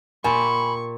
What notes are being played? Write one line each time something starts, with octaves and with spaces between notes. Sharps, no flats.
A#2 G4 G#5 B5 C#6